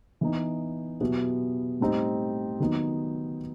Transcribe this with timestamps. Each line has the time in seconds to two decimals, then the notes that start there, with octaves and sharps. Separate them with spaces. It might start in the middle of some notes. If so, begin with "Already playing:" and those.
0.21 E3 B3 D#4
1.01 B2 F#3 B3 E4 G4
1.80 A2 G3 C4 D#4 G4
2.60 D#3 F#3 B3 D#4